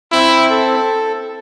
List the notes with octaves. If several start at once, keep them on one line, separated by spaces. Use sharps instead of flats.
C4 E4
A4